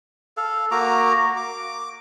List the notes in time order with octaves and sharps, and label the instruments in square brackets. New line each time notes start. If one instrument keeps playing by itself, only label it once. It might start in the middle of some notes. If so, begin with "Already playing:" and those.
[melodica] A4 F5
A#3 F#4 A#5 D6
D6